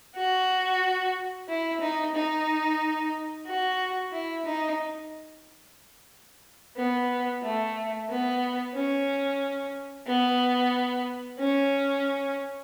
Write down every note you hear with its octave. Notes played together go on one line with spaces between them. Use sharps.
F#4
E4
D#4
D#4
F#4
E4
D#4
B3
A3
B3
C#4
B3
C#4